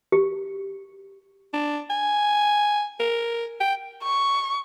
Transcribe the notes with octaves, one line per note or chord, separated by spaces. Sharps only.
G4
D4
G#5
A#4
G5
C#6